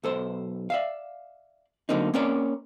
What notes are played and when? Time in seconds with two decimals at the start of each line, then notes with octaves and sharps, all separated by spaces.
0.04 B1 A4 C5
0.70 D5 E5 F5
1.89 D3 F#3 A#3 C4 D#4
2.14 A#3 C4 C#4 A#4 C#5 D5